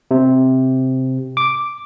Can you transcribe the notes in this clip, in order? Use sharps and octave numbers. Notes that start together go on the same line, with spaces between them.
C3
D6